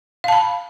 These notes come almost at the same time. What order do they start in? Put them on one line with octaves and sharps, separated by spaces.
F5 A5 B5